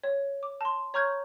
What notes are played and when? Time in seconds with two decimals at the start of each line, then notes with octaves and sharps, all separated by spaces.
0.04 C#5
0.43 D6
0.61 A5 C6
0.94 C#5 A#5 C#6 F6 G6 G#6